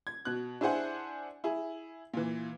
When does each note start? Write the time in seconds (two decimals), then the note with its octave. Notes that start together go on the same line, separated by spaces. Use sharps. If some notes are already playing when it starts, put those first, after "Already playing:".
0.07 G#6
0.25 B2 F#6
0.61 D4 E4 G#4 C5 F#5 G#5
1.44 E4 G#4
2.14 A#2 E3